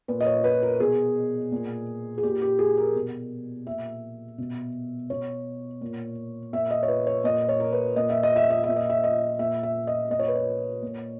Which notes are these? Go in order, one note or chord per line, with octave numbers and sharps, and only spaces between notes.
A#2 B4
D#5
C#5
B4
A#4
B2 G#4
A#2
G#4
A#2 G4
G4
G#4
A#4
B2
A#2 E5
B2
B2 C#5
A#2
A#2 E5
D#5
C#5
B4
C#5
A#2 D#5
C#5
A#4
B4
A#2 D#5
E5
D#5
E5
D#5
A#2 E5
D#5
E5
D#5
A#2 E5
E5
D#5
A#2 D#5
C#5
B4
C#5
A#2